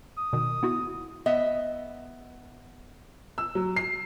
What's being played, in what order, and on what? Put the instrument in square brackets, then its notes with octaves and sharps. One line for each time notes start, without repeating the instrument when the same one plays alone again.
[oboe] D#6
[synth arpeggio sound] B2 D#3
B3 E4 F#4
[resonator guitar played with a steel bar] B3 D#5 E5
[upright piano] E6
F#3
C7